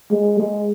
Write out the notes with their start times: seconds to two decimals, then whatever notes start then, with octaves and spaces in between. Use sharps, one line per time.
0.11 G#3
0.39 G#3